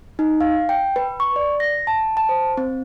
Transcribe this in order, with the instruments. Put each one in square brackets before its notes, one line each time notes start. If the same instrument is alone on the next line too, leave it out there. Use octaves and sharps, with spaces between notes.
[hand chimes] D#4
F5
G5
B4
C#6
D5
A#6
A5
A5
C5
C4